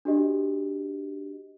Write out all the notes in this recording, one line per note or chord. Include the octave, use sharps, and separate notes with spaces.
D4 F#4 G4 D#5